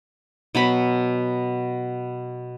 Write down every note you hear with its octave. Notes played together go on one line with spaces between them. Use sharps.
B2 F#3 B5